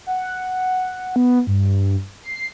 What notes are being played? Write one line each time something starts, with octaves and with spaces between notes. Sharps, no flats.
F#5
B3
G2
C7